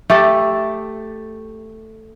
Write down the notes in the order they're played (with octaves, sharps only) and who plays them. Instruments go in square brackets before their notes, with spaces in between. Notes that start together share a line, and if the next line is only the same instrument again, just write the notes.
[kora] A3 G4 A4